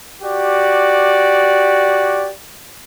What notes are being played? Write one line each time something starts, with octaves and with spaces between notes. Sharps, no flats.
F#4 G4 D5